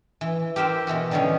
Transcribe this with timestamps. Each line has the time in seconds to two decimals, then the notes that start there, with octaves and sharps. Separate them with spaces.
0.21 E3
0.56 G4 A#4 C5 E5 G5
0.87 B2 E3 B3 F#4
1.11 D3 D#3 G3 B3 C#4